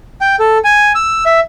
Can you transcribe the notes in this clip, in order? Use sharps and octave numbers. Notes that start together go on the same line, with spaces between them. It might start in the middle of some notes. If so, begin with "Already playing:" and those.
G5
A4
G#5
E6
E5